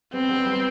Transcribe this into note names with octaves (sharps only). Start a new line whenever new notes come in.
G3 B3 C4
G3 B3
G3 B3